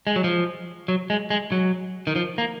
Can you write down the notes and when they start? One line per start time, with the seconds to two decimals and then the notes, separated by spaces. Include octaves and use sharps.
0.07 G#3
0.16 F#3
0.24 F3
0.88 F#3
1.10 G#3
1.30 G#3
1.52 F#3
2.07 D#3
2.16 F3
2.38 A#3